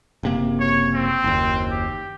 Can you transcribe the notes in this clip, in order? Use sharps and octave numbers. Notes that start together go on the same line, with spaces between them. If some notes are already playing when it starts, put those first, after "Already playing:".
F#1 C3 A#3
C#5
C4
F#1 D#2
G4